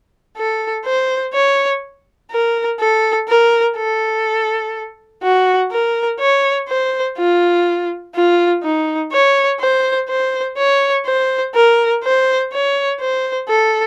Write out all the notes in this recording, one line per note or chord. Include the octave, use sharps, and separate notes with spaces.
A4
C5
C#5
A#4
A4
A#4
A4
F#4
A#4
C#5
C5
F4
F4
D#4
C#5
C5
C5
C#5
C5
A#4
C5
C#5
C5
A4